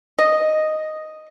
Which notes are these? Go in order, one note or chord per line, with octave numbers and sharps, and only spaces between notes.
D#5